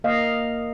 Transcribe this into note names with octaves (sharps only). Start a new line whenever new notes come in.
A#3 D#5 F5